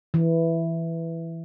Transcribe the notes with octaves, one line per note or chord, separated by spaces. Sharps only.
E3